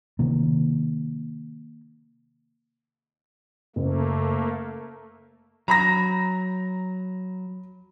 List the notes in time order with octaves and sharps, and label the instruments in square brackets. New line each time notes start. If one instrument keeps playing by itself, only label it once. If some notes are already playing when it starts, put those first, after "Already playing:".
[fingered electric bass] C3 D#3 A#3
[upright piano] F#1 [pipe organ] A3 A#3
[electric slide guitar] F#3 [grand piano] A#5 B5 A#6